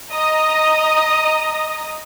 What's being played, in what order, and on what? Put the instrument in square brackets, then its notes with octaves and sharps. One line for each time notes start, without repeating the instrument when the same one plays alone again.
[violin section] D#5 A#5 D#6